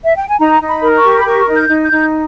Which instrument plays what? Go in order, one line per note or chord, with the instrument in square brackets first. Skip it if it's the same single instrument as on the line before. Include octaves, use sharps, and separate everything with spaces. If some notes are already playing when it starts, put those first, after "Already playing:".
[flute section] E5
G5
G#5
D#4 A#5
D#4
B5
A#4
C#6
G4
B5
A#4 C#6
D#4
G6
D#4
G6
D#4